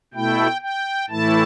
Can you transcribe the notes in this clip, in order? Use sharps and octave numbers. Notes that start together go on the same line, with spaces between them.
B2 A3 E4 G5
G5
A2 E3 A3 E4 A5